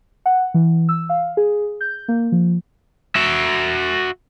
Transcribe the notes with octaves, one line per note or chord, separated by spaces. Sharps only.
F#5
E3
E6
F5
G#4
G6
A#3
F3
F#4 E5